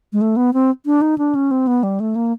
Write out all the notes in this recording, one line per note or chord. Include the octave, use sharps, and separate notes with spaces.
G#3
A3
B3
C4
D4
D#4
D4
C#4
C4
B3
G3
A3
A#3